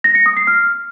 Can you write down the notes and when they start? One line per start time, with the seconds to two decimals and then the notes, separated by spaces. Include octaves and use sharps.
0.04 A#6
0.15 C#7
0.26 D#6
0.37 C7
0.47 F6